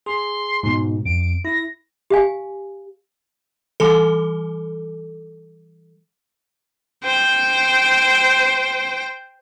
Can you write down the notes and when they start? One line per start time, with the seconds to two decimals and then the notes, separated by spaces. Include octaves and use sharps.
0.06 G#4 C6
0.63 G#2 B2
1.06 F2 D7
1.45 E4 A#6
2.10 G4 F5 G#5
3.80 E3 G3 A4
7.04 C5 G5